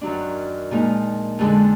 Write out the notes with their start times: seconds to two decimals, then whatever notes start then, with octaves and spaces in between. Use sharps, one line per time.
0.01 F#2 D#3 F#3 D4
0.71 A#2 F3 G#3 D#4
1.39 F2 D3 G#3 D4